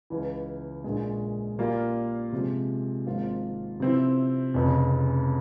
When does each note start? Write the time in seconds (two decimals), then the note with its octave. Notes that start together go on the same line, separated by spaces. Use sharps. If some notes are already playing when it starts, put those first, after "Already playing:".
0.10 C#2 C#3 E3
0.84 A#1 A#2 G#3
1.58 A#2 G3 A#3 F4
2.33 C3 F3 G#3
3.06 G#1 G#2 F3 A#3 F4
3.80 C3 F3 C4 E4
4.54 F1 F2 C#3